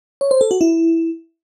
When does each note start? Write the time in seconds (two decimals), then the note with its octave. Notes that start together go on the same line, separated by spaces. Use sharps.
0.21 C#5
0.31 C5
0.41 A4
0.51 F#4
0.61 E4